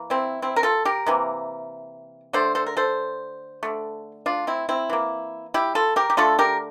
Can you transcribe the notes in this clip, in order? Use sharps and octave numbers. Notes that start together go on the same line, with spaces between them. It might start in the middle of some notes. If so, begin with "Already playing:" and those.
Already playing: E3 A#3
C4 E4
C4 E4
A#4
F4 A4
G4 A#4
C3 E3 A#3
D3 A3 A4 C5
A4 C5
A#4
A4 C5
D3 A3
D4 F4
C4 E4
C4 E4
E3 A#3
E4 G4
F4 A4
G4 A#4
G4
D3 A3 F4 A4
G4 A#4